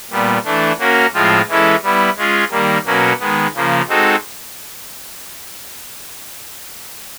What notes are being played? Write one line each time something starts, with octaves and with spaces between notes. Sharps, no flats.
A#2 G3 B3
E3 A3 D4
A#3 C#4 F#4 A#4
A2 F3 G#3 C4 F4
E3 G#3 C#4 E4 A4
G3 B3 E4
G#3 C#4 F4 G#4
D#3 G3 A#3
B2 F#3 A#3 C#4 F#4
D#3 G#3 B3
C#3 F3 A#3
G#3 C4 D#4 F#4 A4